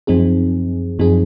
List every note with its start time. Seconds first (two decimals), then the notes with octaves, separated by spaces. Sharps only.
0.07 F#2 F3 C4 D#4 G#4
0.99 F#2 F3 C4 D#4 G#4